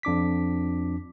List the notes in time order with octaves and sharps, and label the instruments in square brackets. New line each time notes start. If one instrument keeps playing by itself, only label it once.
[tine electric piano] F2 D4 D6 B6